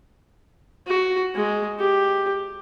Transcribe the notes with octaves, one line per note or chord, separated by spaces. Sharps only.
F#4
G#3
G4